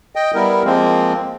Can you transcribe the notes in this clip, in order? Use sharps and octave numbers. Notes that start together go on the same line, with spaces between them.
D#5 G5
G3 B3 E4 A#4
F3 G#3 A#3 C4